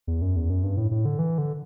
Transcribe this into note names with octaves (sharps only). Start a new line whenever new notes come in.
E2
F#2
E2
F#2
G2
A2
A2
D3
E3
D3